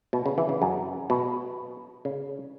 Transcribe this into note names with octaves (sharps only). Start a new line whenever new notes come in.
B2
C#3
E3
C#3
F#2
B2
C#3